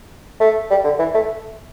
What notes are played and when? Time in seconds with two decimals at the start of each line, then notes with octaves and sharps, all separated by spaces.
0.41 A3
0.70 G3
0.84 D3
0.99 E3
1.15 A3